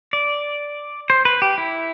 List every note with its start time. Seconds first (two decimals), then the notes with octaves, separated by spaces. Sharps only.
0.13 D5
1.10 C5
1.25 B4
1.42 G4
1.58 E4